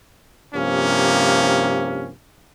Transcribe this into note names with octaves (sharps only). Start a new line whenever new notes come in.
G2 C3 F3 A#3 C#4